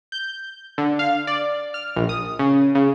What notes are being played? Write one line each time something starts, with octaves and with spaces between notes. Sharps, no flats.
G6
D3
F5
D5
F6
A#1
D#6
C#3
C#3